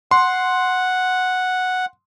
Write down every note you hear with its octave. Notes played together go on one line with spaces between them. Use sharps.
F#5 C6